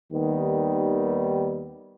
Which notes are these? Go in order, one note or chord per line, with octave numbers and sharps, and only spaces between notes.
D#2 D#3 G3 B3